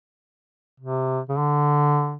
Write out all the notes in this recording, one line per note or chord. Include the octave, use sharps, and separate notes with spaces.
C3
C#3
D3